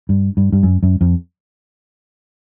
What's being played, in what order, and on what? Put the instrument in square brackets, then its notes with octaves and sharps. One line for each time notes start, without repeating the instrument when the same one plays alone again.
[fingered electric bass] G2
G2
G2
F#2
F#2
F2